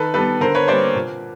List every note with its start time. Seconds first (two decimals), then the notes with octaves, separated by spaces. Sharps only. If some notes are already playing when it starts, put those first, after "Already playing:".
Already playing: D#3 A4 B4
0.14 G3 B3 A4 B4
0.41 D3 A#4 C5
0.55 B4 C#5
0.68 G3 A#3 C5 D5
0.95 A#2